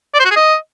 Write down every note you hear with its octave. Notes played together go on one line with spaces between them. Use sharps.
D5
C5
F#4
G#4
D#5